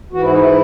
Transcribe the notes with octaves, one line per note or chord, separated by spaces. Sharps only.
G#2 E3 F#4
E4
D#4
E4